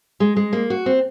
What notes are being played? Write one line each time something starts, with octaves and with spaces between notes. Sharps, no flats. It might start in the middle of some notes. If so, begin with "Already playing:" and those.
G#3
G#3
A#3
F#4
C4